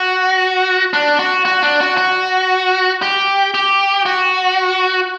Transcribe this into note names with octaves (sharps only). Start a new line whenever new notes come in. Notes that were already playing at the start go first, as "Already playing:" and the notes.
Already playing: F#4
D4
F#4
F#4
D4
F#4
F#4
G4
G4
F#4